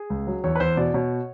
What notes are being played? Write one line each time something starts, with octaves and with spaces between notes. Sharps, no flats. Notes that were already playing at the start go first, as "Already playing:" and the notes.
Already playing: G#4
C#2
F#3
E2 C#5
B4
E2 C5
B2 D5
B2 C#5